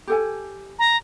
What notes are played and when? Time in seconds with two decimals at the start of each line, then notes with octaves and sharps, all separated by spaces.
0.07 G4 A4 G#5
0.79 A#5